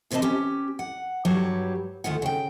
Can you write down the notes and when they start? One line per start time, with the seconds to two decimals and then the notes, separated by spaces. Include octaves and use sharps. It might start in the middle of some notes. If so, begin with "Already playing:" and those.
0.11 E2 C3 C4 B4 D#5 A5
0.22 C#4 G4
0.79 F#5
1.25 G2 F#3 G3 G4 B4 C#5
2.04 D2 D#3 F4 F#5
2.22 C#3 G5